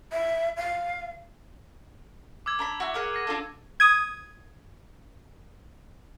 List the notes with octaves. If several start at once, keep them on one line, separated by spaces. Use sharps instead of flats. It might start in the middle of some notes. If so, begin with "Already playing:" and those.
E5
F5
D6 E6 G#6
D4 A#5 B5
E4 F#4
G#4 A#4 F#5
A#6 C7 D#7
D4 F4 A4
D#6 G#6